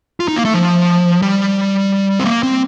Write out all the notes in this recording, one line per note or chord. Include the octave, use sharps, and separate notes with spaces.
F4
D#4
A#3
A3
F3
G3
C4
A#3
C4